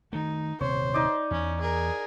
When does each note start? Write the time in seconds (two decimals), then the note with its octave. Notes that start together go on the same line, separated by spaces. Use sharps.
0.13 D#3 A3 D#4
0.61 D#1 C3 C5 C#5
0.94 D#4 D5
1.31 E2 C#4
1.61 G#4 A#4